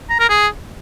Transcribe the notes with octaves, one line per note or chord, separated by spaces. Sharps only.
A#5
A#4
G#4